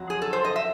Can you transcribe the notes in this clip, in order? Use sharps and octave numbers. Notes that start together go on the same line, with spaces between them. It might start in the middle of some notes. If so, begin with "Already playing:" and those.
Already playing: F2 F#3
G#4
A4
C5
D#5
E5